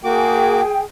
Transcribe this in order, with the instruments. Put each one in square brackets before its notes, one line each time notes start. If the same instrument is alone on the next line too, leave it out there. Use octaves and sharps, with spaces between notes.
[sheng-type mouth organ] A#3 F#4 D6 [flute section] G#4 G5